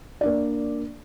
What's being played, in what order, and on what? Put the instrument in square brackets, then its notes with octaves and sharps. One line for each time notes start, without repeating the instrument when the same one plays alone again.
[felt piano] A#3 D4 D5